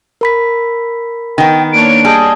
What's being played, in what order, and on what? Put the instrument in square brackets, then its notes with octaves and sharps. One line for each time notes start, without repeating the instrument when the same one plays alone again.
[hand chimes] A#4 B5 B6
[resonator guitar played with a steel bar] D#3 B3 [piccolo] G5
[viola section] A#3 D4 C#5 [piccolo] D7
[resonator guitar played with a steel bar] G3 [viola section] G#4 D#5 [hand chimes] G#5 A5 D#6